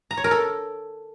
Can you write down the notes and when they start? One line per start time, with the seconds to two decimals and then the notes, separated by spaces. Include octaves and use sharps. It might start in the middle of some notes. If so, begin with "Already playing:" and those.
0.11 A#5
0.17 C#5
0.24 A#4
0.31 A4